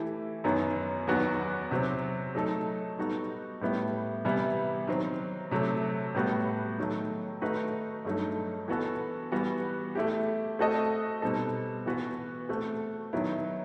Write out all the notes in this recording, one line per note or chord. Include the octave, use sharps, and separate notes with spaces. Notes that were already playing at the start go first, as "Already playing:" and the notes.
Already playing: E3 A3 E4 G4
F#2 D#3 F#3 B3
E2 D#3 F#3 B3 F#4
C3 F#3 C4
F#3 A3 D#4 A4
G3 B3 D#4 F#4 A4
A2 G3 B3 E4
C3 E3 G3 B3 E4
D#3 F#3 C4
C3 F#3 A3
A2 G3 B3 F#4
D#3 F#3 A3
D#3 A3 D#4 F#4 B4
G2 F#3 A3 D#4
E3 B3 F#4 A4
E3 G3 B3 F#4
A3 E4 G4
A3 C4 F#4 A4 D#5
B2 G3 C4 D#4 A4
E3 B3 F#4 B4
A3 C4 F#4
D#3 F#3 B3 E4